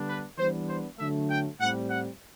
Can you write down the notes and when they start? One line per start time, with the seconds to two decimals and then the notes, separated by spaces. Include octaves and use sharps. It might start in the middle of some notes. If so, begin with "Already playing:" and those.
Already playing: D3 G3 B3 D4
0.08 B4
0.38 E3 G3 B3 D4 C5
0.69 C5
0.99 D3 F#3 A3 E5
1.29 G5
1.61 A2 G3 C4 F#5
1.90 F#5